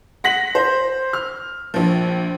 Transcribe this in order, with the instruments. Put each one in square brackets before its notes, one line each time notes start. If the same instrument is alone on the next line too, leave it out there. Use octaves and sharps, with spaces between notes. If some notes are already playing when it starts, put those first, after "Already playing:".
[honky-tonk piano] F#5 A#6 B6 F#7
C5
F6
A#1 F3